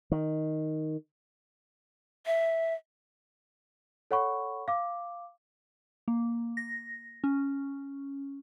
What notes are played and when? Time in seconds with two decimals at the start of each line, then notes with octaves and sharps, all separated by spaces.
0.12 D#3
2.26 E5
4.11 A4 C#5 F#5 B5 C#6
4.68 F5 D6
6.08 A#3
6.57 A#6
7.24 C#4